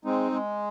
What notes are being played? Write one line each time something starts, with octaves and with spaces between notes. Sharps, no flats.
G#3 C4 D#4
G#3